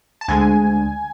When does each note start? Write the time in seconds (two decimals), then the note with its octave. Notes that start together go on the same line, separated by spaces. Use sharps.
0.21 A5
0.28 D2 D3 G#3 G#5